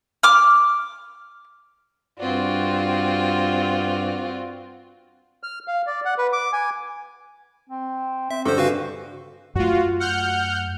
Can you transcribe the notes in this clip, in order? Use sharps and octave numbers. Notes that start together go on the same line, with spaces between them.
D6 F6
G2 C4 F4 F#4 D5
F6
F5
D5
F#5
B4
D6
G#5
C4
C4 E5
G2 D3 A4 C5
C#3 F#4 B4 F5
F#2 A3 F4 F#4
F#5 F6 G6